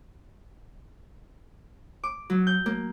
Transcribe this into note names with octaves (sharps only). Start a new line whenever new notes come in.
D6
F#3
G6
A#3